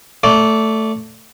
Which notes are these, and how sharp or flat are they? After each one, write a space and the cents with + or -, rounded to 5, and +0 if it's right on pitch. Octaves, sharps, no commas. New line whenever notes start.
A3 +5 D5 -20